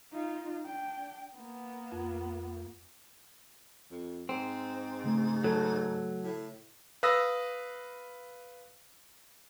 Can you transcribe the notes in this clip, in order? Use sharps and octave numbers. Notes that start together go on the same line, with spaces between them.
D#4 F4
D4 G5
A#3 B3
F2
F2
G#2 C4
C#3 A3
F#3 A4
A2
B4 F5 D#6 E6 A#6